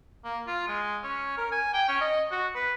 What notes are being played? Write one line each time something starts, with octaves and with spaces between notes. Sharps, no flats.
A#3
F4
G#3
C#4
A#4
G#5
G5
C#4
D#5
F#4
B4